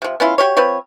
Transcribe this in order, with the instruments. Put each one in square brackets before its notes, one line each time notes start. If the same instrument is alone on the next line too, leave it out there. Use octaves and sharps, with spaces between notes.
[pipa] C3 F3
B3 C#4 E4 F4
F#4 G4 A#4 C#5
F3 C4 B4 C#5